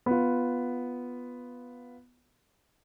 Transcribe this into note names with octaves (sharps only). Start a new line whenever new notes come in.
B3 F4